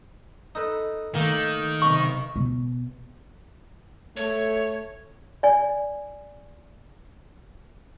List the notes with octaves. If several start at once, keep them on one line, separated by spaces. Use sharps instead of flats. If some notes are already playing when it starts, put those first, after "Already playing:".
D#4 A4 B4
D#3 A3 A#3
B1 C3 B5 C#6
B2
A3 C#5
D5 G#5